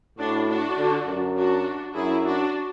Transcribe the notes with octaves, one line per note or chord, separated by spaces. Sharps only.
A2 D4 F#4
D4 F#4
D3
F#2
D4 F#4
F#2 E4 G#4
D4 F#4